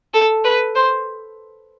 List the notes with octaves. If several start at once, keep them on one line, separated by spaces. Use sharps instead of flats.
A4
B4
C5